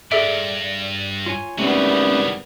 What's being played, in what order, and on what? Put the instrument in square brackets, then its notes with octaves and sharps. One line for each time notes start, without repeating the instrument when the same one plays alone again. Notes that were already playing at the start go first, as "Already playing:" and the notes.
[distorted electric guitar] G2 [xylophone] G#4 A4 E5 [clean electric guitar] D5
[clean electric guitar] F4 C#5 G#5
[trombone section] G#1 G3 B3 [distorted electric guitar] C3 E3 [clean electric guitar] A3 C#4